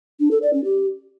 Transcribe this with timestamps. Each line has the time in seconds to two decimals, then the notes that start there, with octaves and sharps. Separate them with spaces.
0.20 D4
0.31 A4
0.42 D5
0.53 C#4
0.64 G4